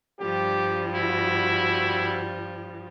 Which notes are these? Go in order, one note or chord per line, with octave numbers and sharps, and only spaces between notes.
G2 F3 G3 G4
E4 F#4